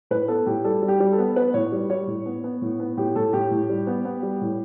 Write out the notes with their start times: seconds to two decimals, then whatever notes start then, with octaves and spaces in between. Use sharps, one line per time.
0.11 A2 B4
0.28 B3 A4
0.46 A2 G4
0.64 G3 A4
0.82 G3
0.88 G4
1.00 G3
1.12 A4
1.18 B3
1.36 B3 B4
1.54 A2 C#5
1.72 G3
1.90 G3 C#5
2.08 A2
2.25 B3
2.44 B3
2.62 A2
2.80 B3
2.97 A2 G4
3.16 A2 A4
3.33 A2 G4
3.51 A2
3.69 G3
3.87 B3
4.05 B3
4.23 G3
4.41 A2